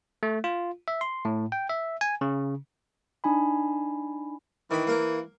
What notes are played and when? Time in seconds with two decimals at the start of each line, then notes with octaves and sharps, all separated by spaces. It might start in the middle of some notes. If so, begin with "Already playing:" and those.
0.23 A3
0.44 F4
0.88 E5
1.01 C6
1.25 A2
1.52 G5
1.69 E5
2.01 G#5
2.21 C#3
3.24 D4 D#4 G#5 B5
4.71 D#3 E3 B5
4.87 A#3 A#4